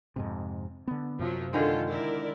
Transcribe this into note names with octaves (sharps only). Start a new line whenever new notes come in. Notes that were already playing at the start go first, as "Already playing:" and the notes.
F2 G#2 C3
D3 B3
F#2 C3 F3 F#3
D3 D#3 G#3 F4 A4
E4 A#4 D5